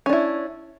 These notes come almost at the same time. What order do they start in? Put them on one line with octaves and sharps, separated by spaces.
C#4 D4 E4